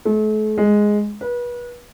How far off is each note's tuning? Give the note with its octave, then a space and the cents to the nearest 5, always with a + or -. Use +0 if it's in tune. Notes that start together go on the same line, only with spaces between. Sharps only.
A3 -40
G#3 +0
B4 -30